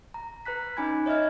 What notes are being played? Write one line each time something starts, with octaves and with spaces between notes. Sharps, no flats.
A#5
B4 A#5 F#6 B6
C#4 D#4 G#5 B5 G#6
C#5 D#5 E5 F6 G#6